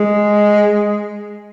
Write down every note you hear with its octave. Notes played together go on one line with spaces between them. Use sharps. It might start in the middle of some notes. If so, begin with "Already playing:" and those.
Already playing: G#3